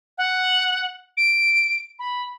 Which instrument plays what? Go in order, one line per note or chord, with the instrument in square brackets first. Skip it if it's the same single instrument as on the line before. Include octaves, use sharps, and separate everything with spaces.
[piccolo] F#5
D7
B5